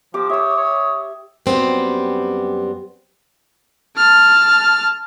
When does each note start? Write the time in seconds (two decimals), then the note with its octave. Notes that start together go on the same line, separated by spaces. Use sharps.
0.14 F3 G4 D6
0.29 C#5 E5 D#6 E6
0.56 C#5
1.46 F#2 G3 B3 C4 G4
3.97 A5 F6